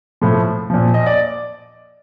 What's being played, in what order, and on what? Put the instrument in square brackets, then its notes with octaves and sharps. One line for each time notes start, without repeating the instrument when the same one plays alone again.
[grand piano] A2 F3
A#2 F3
D#5
D5